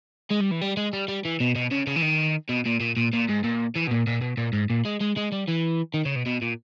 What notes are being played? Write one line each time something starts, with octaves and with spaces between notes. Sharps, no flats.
G#3
G3
E3
G3
G#3
G3
G3
E3
B2
B2
C#3
C#3
E3
D#3
B2
A#2
A#2
A#2
A#2
G#2
A#2
E3
B2
A#2
A#2
B2
A#2
G#2
A#2
G#3
G#3
G#3
G3
E3
D#3
C#3
B2
B2
A#2